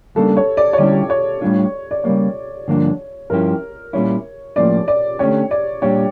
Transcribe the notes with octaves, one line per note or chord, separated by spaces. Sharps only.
C#2 C#3 G3 A#3 D4 A4
C#5
D5
C#5
D3 G3 C#4 E4 G4 D5
C#5
A2 G3 D4 F4
D5
C#3 G3 A#3 C#5
G2 D3 F3 A#3 D4
G2 F3 C#4 E4 G4 A#4
A#2 G3 C#4 E4 C#5
A2 F3 A#3 C#4 D5
D5
D3 A3 C#4 G4 C#5
D5
A#2 G3 D4 G4 C#5